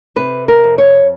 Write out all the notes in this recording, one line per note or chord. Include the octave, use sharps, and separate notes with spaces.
C3 B4
A#4
F2
C#5